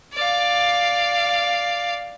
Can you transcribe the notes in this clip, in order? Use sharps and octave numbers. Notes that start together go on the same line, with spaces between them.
D5 F5